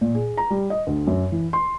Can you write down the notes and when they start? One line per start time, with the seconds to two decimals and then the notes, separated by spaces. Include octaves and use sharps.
0.01 A#2
0.15 G#4
0.37 A#5
0.50 G3
0.70 D#5
0.87 D2
1.07 F#2
1.32 E3
1.53 C6